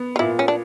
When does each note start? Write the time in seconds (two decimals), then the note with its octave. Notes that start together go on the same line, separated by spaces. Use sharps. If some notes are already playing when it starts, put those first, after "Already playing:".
Already playing: B3
0.16 F4
0.19 A#2 E4
0.39 C#4
0.48 D4